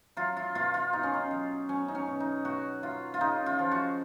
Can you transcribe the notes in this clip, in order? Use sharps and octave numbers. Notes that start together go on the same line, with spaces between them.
F#3 F4
F4
B2 F4
F4
B2 D#4
C#4
D#4
F#3
F#3 C#4
D#4
C#4
B2
D#4
B2 F#4
F#3 F4
F4
C#3 D#4
F4
F3
F#4